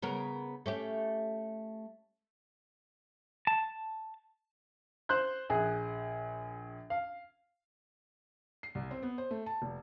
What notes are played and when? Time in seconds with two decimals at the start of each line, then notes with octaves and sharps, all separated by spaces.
0.02 C#3 B3 A#4
0.66 A3 C#4 G4
3.47 A5
5.09 C5 C6 F#6 G6
5.50 A#1 G#4
6.90 F5
8.63 C7
8.75 C2
8.91 C4
9.03 B3
9.18 C5
9.31 A3
9.46 A5
9.62 F1